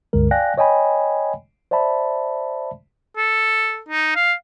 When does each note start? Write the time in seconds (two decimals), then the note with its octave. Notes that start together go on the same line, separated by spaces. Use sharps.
0.13 C#2 G2 D3 G#3 A#4
0.31 D5 F5 G5 G#5 F#6 A#6
0.58 C#5 D#5 G5 G#5 B5
1.71 C5 D5 E5 A5 B5
3.17 A4
3.88 D#4
4.15 F5